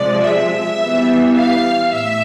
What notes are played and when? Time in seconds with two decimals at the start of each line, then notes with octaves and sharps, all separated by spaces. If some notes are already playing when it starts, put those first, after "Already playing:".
Already playing: C3 F3 G#3 D5
0.23 E5
0.80 E3 G3 B3
1.36 F5
1.93 A2 E5